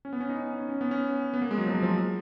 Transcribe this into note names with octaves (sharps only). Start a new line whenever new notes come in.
C#4
B3
C#4
D#4
C#4
C#4
C#4
B3
C#4
B3
A#3
G#3
F#3
F3
F#3
F3
F#3
F3